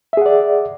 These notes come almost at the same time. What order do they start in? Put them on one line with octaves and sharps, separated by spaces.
E5 G#4 F#5 D5